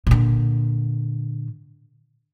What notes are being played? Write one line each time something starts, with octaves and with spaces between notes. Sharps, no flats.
A#2 D3